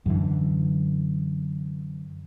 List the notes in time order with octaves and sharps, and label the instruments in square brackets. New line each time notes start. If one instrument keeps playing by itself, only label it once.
[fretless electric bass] F#2 D3 E3